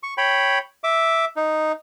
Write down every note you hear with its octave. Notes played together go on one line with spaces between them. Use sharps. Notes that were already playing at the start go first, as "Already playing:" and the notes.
C#6
C#5 G5 B5
E5 D6
D#4